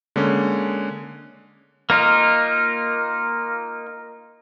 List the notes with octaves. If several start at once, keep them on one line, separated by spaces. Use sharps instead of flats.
D3 G#3 A#3 C#4
A#3 D#4 F4